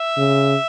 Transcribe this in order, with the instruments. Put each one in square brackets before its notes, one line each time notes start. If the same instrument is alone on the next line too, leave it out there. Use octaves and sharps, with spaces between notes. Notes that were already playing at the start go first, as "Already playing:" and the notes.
Already playing: [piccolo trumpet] E5
[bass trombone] C#3